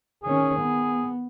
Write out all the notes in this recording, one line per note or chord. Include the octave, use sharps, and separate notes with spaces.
D#3 C#4 G#4
B3